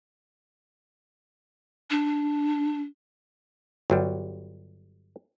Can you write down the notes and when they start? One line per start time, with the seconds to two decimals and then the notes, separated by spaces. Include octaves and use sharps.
1.90 D4
3.90 G1 F#3 G3